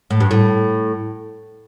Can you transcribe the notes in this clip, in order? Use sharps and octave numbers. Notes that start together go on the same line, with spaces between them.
A2
G2
A2